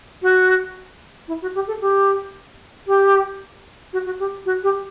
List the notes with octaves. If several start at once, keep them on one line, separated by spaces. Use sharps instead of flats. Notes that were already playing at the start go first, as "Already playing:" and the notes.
F#4
E4
F#4
G4
A4
G4
G4
F#4
F#4
G4
F#4
G4